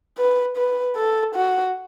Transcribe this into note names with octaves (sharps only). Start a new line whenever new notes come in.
B4
B4
A4
F#4